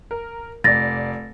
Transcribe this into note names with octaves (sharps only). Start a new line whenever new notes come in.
A#4
F1 D5 A6 A#6